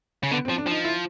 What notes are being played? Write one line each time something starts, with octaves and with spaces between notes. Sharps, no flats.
C#3
D3 B3
C4
F3
D4
F3 D#4
E4